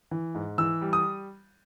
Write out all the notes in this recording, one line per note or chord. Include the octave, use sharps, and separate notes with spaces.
E3
G#2
E3 E6
G3
D#6